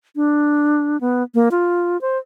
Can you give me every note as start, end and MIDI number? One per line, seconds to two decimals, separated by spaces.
0.16 1.00 62
1.01 1.23 59
1.35 1.49 58
1.51 2.00 65
2.01 2.18 72